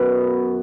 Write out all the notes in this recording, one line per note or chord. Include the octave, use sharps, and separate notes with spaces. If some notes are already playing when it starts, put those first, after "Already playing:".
Already playing: F#2 F#3 B3